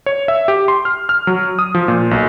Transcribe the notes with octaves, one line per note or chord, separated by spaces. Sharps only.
C#5
E5
G4
C6
F6
F6
F#3
D#6
F3
A#2
B1